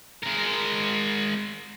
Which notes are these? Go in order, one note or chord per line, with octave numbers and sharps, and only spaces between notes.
G#3 A#4